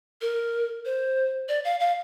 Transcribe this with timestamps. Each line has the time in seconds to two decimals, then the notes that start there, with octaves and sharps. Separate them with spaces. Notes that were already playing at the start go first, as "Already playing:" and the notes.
0.21 A#4
0.85 C5
1.49 D5
1.65 F5
1.80 F5